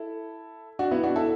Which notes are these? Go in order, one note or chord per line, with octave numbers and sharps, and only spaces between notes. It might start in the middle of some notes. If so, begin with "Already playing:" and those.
Already playing: E4 A4
D4 F#4
B3 E4
D4 F#4
E4 A4